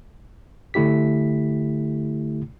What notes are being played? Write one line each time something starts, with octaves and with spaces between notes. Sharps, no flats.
D3 A3 E4 G4 B6